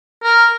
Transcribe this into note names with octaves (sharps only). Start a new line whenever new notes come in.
A#4